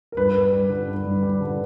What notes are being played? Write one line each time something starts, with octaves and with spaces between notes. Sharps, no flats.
A#4
G2 B4
G2
G3
D3
G2
G2
G3
D3